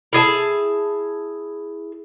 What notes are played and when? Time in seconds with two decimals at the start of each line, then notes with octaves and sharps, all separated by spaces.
0.13 E4 G#4 A5